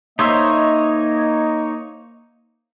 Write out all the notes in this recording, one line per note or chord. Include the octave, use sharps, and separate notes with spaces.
A#3 D#4 C5 C#5 D#5 E5 A#5